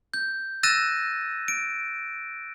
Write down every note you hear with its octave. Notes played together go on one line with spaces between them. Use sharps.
G6
E6 F#6 A6 A#6 D#7 E7
D7